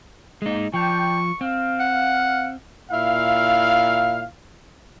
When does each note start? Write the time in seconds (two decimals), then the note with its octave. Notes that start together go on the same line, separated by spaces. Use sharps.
0.42 G#3 A#3 D#4
0.74 F3 D4 G5 C#6
1.41 C4 F5
1.80 F#5
2.91 A#2 E4 F5